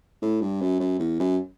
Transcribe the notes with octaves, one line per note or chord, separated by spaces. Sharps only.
A2
G2
F#2
F#2
E2
F#2